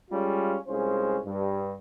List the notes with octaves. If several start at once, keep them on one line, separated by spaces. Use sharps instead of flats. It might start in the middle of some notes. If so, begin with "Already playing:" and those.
G3 G#3 C#4 F4
C2 G#3 C#4 F4 C5
G2